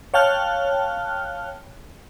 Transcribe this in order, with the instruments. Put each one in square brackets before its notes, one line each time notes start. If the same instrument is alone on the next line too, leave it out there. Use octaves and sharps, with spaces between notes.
[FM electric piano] C#5 F5 G5 A5 F6 F#6